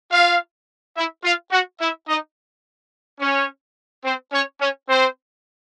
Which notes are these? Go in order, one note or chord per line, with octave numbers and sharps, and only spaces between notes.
F4 F5
E4 E5
F4 F5
F#4 F#5
E4 E5
D#4 D#5
C#4 C#5
C4 C5
C#4 C#5
C#4 C#5
C4 C5